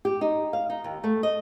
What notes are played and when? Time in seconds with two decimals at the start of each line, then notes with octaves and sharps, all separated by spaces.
0.05 G4
0.21 D#4
0.53 F5
0.70 D#4
0.84 D#2
1.04 A3
1.23 D#5